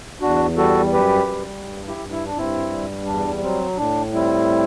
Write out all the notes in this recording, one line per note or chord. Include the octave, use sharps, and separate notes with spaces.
E2 D4 F#4
G3 F#4 A4
F#2 G4 B4
G3
G2
E4 G4
G2
E4
D4
G2 C4 E4
G3
E2 D4
F#3 C4
A2 D4
G3 C4 E4